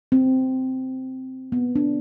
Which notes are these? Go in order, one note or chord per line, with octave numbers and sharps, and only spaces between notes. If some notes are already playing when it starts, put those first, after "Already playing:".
C4
B3
D4